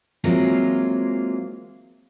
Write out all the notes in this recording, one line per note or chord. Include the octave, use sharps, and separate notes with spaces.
E3 F#3 G#3 A#3 C4 F4